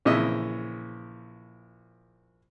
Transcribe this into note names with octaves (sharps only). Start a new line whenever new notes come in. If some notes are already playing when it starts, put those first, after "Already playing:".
A#1 C#3 E3 D#5 E5